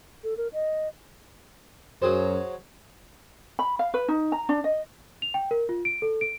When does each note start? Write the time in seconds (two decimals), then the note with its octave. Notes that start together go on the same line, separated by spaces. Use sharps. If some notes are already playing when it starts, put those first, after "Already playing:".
0.24 A4
0.37 A#4
0.53 D#5
2.02 F#2 F#3 G#4 C5
3.59 B5
3.79 F5
3.94 B4
4.08 D#4
4.32 A#5
4.49 D4
4.64 D#5
5.22 F7
5.34 G5
5.51 A#4
5.69 F4
5.85 D7
6.02 A4
6.21 D7